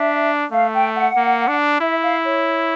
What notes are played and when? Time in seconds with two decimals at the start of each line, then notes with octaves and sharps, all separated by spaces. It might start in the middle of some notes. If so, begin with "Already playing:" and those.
Already playing: D4 E5
0.51 A3 F5
0.73 G5
0.94 F#5
1.16 A#3
1.48 D4
1.80 E4 E5
2.02 F5
2.23 C#5